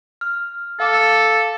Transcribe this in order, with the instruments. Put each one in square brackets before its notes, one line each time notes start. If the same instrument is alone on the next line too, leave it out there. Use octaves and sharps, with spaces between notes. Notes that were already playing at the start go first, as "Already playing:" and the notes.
[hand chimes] F6
[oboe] A4 [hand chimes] F5 D6